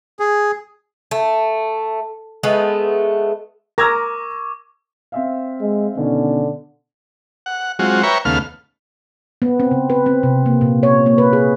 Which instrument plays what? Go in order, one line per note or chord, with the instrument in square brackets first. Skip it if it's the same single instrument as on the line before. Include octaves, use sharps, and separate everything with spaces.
[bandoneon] G#4
[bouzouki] A3
G#3 A3 B3
[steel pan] A#4 A#5 [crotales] C#6 D6 [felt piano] E6 G#6 A#6
[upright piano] C4 E5 F5
[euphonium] G#3
[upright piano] B2 D#3 C#4 [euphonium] D3
[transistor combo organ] F#5
F#3 G#3 C4 F4 F#4
B4 C#5 E5 G5 A#5 C#6
D#2 C#3 A3 B3 F5 F6
[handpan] B3
C4
C#3
B4
C4
C3
A#3
A#2
C#5
A#3
B4
G#4